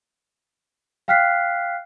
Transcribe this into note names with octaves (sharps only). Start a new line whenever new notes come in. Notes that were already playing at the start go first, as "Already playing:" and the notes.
F5 G5 F6 F#6 B6 C7